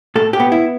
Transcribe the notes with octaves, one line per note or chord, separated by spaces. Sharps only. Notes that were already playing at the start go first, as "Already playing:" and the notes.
A2 A4
G4
B3
E4